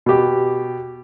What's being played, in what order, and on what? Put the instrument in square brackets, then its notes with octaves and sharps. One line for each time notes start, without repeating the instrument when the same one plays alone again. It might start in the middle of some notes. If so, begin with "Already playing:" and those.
[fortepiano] B2 G4